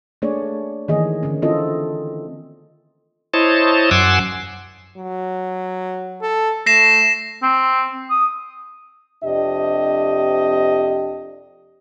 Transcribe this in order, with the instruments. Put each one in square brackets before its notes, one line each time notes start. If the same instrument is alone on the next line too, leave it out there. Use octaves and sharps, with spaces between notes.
[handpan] A3 A#3 D4 G#4 C#5 D5
D#3 E3 A3 A#3 G#4 D#5
D3 C#4
C4 E4 F4 A4 D#5
[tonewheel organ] E4 C5 C#5 D#5 A5
F#2 F#5 G#5 C6 D6 E6
[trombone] F#3
A4
[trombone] A3 [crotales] A#6 C7 E7
[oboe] C4
D#6
[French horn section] F2 C3 D4 G4 D#5